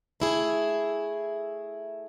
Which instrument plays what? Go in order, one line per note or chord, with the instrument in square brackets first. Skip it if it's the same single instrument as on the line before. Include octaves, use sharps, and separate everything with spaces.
[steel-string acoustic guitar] A3 E4 G#4